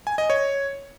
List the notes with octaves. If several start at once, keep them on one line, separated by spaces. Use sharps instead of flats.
G#5
D#5
C#5